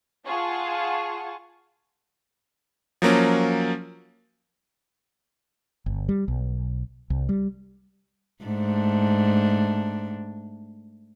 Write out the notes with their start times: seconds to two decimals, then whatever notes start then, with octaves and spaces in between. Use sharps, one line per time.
0.24 F4 G#4 F#5 A5 C#6
3.02 F3 F#3 A#3 C#4
5.86 G1
6.09 G3
6.28 B1
7.10 C2
7.29 G3
8.45 G#2 A3 D4